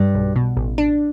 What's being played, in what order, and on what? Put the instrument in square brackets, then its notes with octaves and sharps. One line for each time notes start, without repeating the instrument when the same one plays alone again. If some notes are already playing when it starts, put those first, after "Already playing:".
Already playing: [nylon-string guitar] G2
[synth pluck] B1
B2
A1
D4